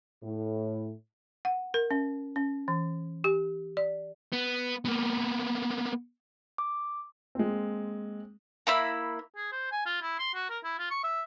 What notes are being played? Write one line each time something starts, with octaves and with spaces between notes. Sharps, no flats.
A2
F#5
A#4
C#4
C#4
E3
G4
D5
B3
A#3 B3
D6
G#3 A#3 C4
A#3 E4 B5
G#4
C5
G#5
F4
E4
C6
F#4
A#4
E4
F4
C#6
E5